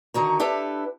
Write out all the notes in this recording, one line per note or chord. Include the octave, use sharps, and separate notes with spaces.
D3 D#3 F#4 A#5
D4 E4 G4 A4 B4